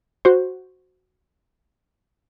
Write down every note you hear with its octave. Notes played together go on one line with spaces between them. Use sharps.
F#4 C5